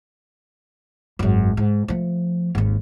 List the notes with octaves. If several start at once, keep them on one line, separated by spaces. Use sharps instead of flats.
G#1 F#2
G#2
F3 A3
G#1 D#2